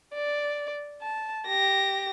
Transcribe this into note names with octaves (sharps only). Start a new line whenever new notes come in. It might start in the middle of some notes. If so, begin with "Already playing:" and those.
D5
A5
G4 A#6